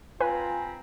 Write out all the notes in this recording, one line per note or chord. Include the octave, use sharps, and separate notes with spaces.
C4 F4 B4 G#5 A#5 B5